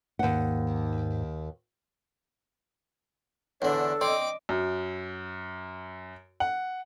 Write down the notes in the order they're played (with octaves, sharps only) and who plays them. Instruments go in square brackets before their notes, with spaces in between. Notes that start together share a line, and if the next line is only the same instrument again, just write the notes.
[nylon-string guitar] D#2 F#5 [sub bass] G#2
[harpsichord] E2 D3 [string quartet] D4 [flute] A4 [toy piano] C#5
[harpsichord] C4 [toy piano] D5 C6 [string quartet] D#5 D6
[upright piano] F#2
F#5